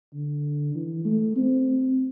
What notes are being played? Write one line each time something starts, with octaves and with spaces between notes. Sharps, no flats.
D3
E3
A3
C4